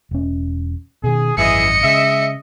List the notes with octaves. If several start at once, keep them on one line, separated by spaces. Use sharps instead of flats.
E1 C#4
B2 D#3 G#4
G#1 F#2 E3 G#4 D#5 E5 C#7
C#3 G#3 E5